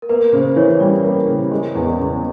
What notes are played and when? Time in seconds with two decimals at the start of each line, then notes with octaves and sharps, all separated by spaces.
0.02 A#4
0.09 A#3 B4
0.33 C#3 C5
0.56 E3 C#5
0.80 G3 D5
1.04 A#3
1.27 C#3
1.51 G#3
1.75 E2
1.99 C#3